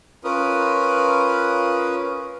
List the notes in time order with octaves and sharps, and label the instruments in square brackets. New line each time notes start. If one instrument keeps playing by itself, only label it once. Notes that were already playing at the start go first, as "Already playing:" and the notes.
[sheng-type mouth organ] C#4 F4 A#4 B4 D#6